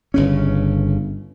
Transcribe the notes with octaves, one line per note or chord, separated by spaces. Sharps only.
G1 C#3 C#4